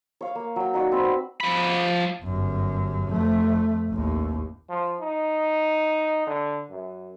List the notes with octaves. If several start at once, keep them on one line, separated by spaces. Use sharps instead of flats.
C#5 F5
A#3
F#3 G5
D#4 F#4 D5
C4 B5
B4
F3 B5
G1 F#2
F2 A3
A1 D#2
F3
D#4
D3
F#2